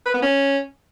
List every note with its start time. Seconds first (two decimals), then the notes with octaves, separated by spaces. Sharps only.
0.06 B4
0.14 B3
0.22 C#4